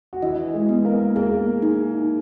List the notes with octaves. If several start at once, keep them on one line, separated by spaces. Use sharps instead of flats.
F#4
E3 E4 D#5
G#3 G#4
B3
A#3 A#4
A#3 G#4 A#4
D#4